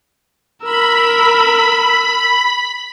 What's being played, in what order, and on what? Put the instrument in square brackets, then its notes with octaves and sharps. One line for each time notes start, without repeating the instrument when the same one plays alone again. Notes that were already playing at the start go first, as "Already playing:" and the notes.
[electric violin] A#4 E6 [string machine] B5